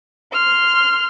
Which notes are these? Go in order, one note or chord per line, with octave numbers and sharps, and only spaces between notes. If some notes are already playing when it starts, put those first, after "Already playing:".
C6 F6